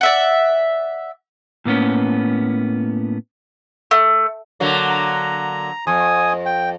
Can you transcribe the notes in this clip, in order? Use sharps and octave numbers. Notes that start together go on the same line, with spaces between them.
D5 E5 F#5
A2 A#3 B3 C#4
A3
D3 F#3 A#3
A#5
F2 G#5 D#6
G5